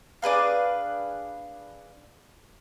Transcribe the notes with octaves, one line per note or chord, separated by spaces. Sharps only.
D4 G#4 B4 F5